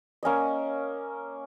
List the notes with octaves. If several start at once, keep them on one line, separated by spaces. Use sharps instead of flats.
A#3 C#4 C#5 D#5